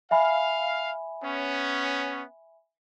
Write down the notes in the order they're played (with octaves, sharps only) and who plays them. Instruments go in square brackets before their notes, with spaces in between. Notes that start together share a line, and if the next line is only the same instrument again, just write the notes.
[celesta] E5 G#5 B5 [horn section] F5
[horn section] B3 C#4